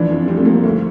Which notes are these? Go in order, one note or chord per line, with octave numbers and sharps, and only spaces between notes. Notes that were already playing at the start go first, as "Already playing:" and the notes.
Already playing: E3 F3 D4
F2
G3 C4
A3
F2 A#3
D2 A3